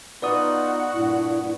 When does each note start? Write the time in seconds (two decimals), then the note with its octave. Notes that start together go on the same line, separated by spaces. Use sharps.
0.22 B3 D#4 F4 F#4 B4 D5 F#5 D#6
0.93 G2 A#2 E4